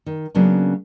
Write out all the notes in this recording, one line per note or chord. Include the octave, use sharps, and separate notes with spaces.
D#3
C#3 F#3 A#3 B3 C#4 D4